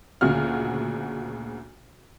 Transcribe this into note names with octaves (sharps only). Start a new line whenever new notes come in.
D2 A#2 C#3 F#4 F6